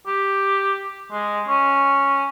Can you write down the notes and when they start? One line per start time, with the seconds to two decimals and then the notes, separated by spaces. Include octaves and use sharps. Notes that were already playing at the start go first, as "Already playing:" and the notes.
0.07 G4
1.12 G#3
1.48 C#4